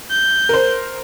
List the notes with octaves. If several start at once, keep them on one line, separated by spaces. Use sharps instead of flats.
G6
A#4 C5